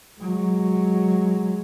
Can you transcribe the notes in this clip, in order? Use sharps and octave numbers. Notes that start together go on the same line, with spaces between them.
F#3 G#3